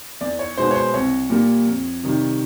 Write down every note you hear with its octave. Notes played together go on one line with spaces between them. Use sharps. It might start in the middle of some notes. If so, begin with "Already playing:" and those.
E2 D5
C#5
B2 G#3 B3 C5
C#5
C5
C2 C#5
A#2 G3 A#3
F2
C3 D#3 G3